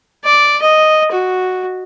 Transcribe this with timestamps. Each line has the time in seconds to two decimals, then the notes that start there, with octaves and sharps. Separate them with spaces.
0.24 D5
0.62 D#5
1.11 F#4